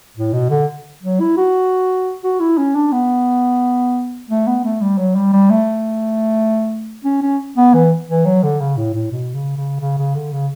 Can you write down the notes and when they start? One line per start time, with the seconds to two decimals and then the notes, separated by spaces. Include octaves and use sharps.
0.17 A2
0.33 B2
0.50 D3
1.03 F#3
1.20 E4
1.37 F#4
2.23 F#4
2.40 E4
2.58 C#4
2.75 D4
2.92 B3
4.29 A3
4.47 B3
4.64 A3
4.81 G3
4.98 F#3
5.16 G3
5.33 G3
5.50 A3
7.05 C#4
7.22 C#4
7.57 B3
7.74 E3
8.08 E3
8.25 F#3
8.43 D3
8.60 C#3
8.77 A2
8.94 A2
9.11 B2
9.35 C#3
9.57 C#3
9.80 C#3
9.98 C#3
10.15 D3
10.32 C#3